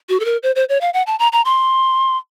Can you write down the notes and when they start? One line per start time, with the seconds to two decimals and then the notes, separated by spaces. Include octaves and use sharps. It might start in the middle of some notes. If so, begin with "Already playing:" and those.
0.09 F#4
0.20 A4
0.25 A#4
0.43 C5
0.56 C5
0.69 C#5
0.81 F5
0.94 F#5
1.07 A5
1.19 A#5
1.33 A#5
1.45 C6